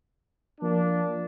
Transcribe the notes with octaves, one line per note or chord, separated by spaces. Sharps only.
F3 A#3 D4